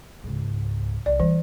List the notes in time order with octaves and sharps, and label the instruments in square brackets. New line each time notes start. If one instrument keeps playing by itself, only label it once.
[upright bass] C#2 G#2
[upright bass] C2 [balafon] D5
[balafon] E3 [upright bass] G3